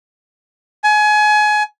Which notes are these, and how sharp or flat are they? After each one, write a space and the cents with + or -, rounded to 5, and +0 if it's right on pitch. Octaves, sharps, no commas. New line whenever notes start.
G#5 +25